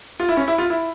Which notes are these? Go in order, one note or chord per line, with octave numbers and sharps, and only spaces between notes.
F4
E4
C#4
E4
F4
E4